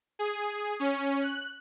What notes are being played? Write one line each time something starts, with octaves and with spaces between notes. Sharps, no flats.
G#4
C#4
F#6